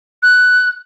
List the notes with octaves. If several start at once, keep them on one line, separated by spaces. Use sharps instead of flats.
F#6